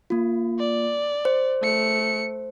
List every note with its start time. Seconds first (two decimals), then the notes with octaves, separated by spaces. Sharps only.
0.10 A#3 F4
0.59 D5
1.25 C5
1.62 A3 C#7